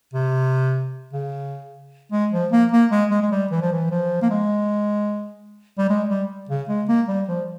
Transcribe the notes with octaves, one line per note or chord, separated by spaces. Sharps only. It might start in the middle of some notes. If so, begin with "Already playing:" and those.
C3
C#3
G#3
F3
A#3
A#3
G#3
G#3
G#3
G3
E3
F3
E3
F3
A#3
G#3
G3
G#3
G3
C#3
G#3
A#3
G3
F3